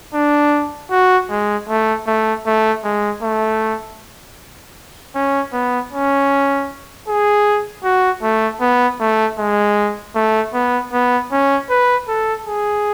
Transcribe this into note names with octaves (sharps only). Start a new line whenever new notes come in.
D4
F#4
G#3
A3
A3
A3
G#3
A3
C#4
B3
C#4
G#4
F#4
A3
B3
A3
G#3
A3
B3
B3
C#4
B4
A4
G#4